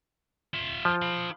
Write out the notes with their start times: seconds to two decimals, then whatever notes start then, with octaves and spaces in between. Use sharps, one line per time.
0.54 F4 E5
0.85 F3
1.02 F5 B5